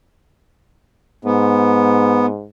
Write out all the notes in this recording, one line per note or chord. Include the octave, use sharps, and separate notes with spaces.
G#2 B3